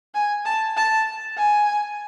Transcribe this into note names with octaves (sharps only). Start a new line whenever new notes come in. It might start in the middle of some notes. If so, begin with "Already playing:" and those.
G#5
A5
A5
G#5